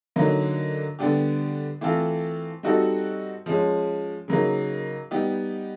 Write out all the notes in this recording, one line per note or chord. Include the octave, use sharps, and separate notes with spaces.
D3 F#3 A#3 D#4
D3 G3 B3 D4 G4
E3 A3 C4 F4 A4
G3 C4 D#4 F#4 A4
F3 G#3 C#4
C#3 F#3 A#3 D#4
G3 B3 D#4 G4